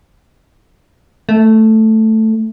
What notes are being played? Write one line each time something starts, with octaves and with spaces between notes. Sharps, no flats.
A3